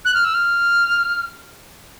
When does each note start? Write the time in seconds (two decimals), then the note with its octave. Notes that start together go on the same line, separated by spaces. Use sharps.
0.05 F#6
0.14 F6
0.25 E6
0.34 F6